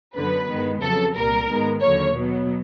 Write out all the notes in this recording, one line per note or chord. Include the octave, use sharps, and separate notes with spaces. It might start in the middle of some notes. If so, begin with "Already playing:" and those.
F#2 D3 F#3 B3 B4
G2 D#3 G#3 B3
F2 C#3 F#3 A4
C2 A#2 G3 A#4
G#2 D#3 G#3 B3
D#2 D3 F#3 A#3 C#5
B2 F#3 B3